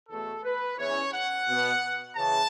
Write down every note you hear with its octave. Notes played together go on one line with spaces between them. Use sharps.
E2 B2 A3 A4
B4
E2 E3 C#4 C#5
F#5
B2 B3
C#3 E3 A5